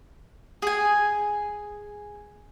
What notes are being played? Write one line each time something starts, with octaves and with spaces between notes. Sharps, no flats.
G#4 G#5